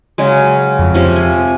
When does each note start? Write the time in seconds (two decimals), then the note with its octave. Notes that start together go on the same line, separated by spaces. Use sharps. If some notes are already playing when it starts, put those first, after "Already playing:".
0.18 C#3 F#3 G#3
0.79 F2
0.94 C3 F3 C#4
1.16 G#5